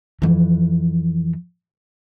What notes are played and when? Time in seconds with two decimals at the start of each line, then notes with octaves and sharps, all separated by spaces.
0.22 F2 E3